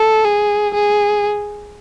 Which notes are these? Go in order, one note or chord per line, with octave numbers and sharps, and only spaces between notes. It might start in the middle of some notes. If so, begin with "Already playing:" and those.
Already playing: A4
G#4
G#4